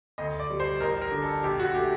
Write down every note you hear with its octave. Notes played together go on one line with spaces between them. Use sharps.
D2 D#5
D5
G3
C5
A1 A#4
A#4
D3
A4
A#1 G4
F#4
A3 G4